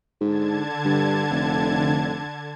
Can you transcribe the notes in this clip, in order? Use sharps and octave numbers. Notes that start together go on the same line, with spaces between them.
G#2 D3 A5 G#6
G2
F1